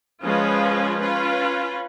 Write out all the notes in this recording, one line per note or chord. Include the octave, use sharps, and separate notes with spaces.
F3 G#3 C#4 F4 B4
C#4 F4 B4